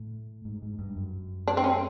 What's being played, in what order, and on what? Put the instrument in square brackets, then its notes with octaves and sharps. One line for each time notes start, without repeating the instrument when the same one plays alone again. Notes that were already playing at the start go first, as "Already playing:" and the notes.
Already playing: [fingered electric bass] A2
G#2
G#2
G2
F#2
[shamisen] D4
C4
C#4